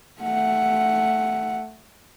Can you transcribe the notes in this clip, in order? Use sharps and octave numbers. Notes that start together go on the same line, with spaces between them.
A3 F#5